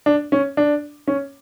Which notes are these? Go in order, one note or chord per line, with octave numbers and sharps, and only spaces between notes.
D4
C#4
D4
C#4